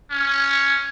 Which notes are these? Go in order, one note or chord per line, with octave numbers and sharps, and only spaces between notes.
C#4